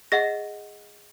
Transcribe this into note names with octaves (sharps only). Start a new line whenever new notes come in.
G#4 D#5 F#5 A#6